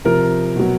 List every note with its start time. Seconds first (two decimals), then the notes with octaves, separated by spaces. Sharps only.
0.05 C3 F3 A#4
0.56 B2 F#3